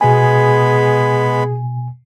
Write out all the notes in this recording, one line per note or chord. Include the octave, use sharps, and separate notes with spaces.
B2 G#3 B3 G#4 G#5 B5